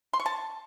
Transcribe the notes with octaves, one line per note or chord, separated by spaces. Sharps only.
C6
C#6
A5